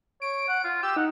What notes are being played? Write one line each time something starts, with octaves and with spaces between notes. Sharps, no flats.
C#5 D7
F#5
F4
G4 E6
D#4 F#5